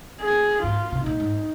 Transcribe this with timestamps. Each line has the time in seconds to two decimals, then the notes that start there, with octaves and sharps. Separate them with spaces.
0.22 G#4
0.63 G#2 F4
0.92 C3
1.06 A#2 D#4
1.20 G#2